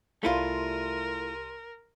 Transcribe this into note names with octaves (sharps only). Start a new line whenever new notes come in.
C2 A3 E4 F4 A#4 C6 D#7